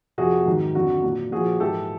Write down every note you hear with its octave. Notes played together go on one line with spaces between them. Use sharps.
F2 C3 F3 F#4 G#4
G#2 D#3 F#3
F2 D3 F#3 F#4
A#2 F#3
A#2 F3 F#4 G#4
G#2 E3 G4 A4